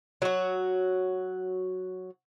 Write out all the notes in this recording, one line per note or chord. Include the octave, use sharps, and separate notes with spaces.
F#3 F#4